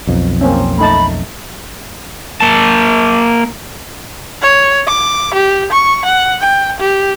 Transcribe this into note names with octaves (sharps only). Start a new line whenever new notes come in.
B1 F2
A#3 C4 C#4
A3 D#4 A5 B5
A#3 A5
C#5
D6
G4
C#6
F#5
G5
G4